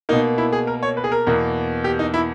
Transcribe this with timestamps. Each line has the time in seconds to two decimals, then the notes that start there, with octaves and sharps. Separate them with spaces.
0.09 B2 A#3 D#4
0.38 E4
0.53 G#4
0.67 A#4
0.83 C#5
0.97 B4
1.04 G#4
1.12 A#4
1.27 E2 B2 A#3
1.84 G4
1.99 D#4
2.14 E4